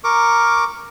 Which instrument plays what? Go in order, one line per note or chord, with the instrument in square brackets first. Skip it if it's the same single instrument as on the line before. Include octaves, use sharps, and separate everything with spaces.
[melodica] A#4 C#6 D6